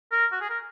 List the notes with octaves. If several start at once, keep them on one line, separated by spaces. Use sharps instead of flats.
A#4
F#4
G#4
A#4